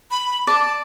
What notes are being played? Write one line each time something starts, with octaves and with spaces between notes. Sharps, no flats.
B5
D5 A5